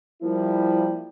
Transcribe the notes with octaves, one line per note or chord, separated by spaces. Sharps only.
F3 G3 A#3 E4